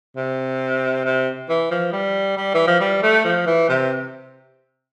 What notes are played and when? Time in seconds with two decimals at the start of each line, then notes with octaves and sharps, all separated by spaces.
0.17 C3
1.05 C3
1.49 E3
1.71 F3
1.92 G3
2.37 G3
2.54 E3
2.67 F3
2.80 G3
3.03 A3
3.24 F3
3.47 E3
3.69 C3